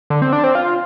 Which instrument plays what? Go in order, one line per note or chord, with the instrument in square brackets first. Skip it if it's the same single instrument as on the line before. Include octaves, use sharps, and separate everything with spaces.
[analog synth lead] D3
C4
D4
C4
F4